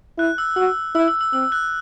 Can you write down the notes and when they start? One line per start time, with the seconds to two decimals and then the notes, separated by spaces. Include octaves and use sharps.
0.18 E4 F#6
0.38 E6
0.57 F#4 E6
0.95 E4 E6
1.08 E6
1.21 E6
1.33 C4 E6
1.52 F#6